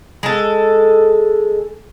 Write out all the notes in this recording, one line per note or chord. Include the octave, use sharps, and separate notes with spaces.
G#3 A4